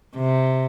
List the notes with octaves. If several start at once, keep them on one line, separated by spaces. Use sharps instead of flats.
C3